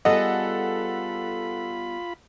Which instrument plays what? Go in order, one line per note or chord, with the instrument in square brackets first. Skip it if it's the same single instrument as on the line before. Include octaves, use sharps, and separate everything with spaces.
[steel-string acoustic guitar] G3 B3 G#4 [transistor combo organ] F4 B5 [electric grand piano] A4 F#5 [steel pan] D#5